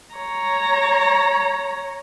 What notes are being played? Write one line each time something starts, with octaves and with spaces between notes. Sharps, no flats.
C#5 A#5